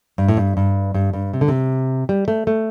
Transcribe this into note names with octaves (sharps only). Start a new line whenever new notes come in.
G2
A2
G2
G2
G2
G2
C3
D3
C3
G3
A3
A3